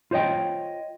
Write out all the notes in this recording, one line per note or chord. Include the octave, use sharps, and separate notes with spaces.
F4 C5 C#5 D#5 G5